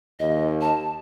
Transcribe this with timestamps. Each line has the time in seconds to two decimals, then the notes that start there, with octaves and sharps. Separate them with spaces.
0.20 D#2 D#5
0.61 A5